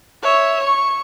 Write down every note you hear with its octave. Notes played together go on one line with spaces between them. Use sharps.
C#5 E5
C#6